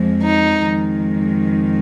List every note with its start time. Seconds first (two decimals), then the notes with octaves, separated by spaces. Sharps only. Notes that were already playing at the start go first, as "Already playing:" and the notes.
Already playing: F2 F3 G#3
0.22 D#4
0.69 F2 D#3 G#3